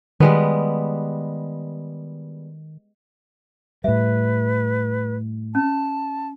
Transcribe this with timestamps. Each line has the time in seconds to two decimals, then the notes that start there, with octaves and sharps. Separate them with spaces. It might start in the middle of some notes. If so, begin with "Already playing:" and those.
0.20 D#3 G3 G#3 B3
3.84 A2 G3 B4 E5
5.55 C#4 A5